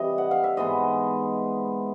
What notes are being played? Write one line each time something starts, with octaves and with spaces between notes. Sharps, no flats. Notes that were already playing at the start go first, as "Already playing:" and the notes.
Already playing: C3 E3 G3 D#5
F#5
F5
E5
G#2 E3 G#3 B3 D#5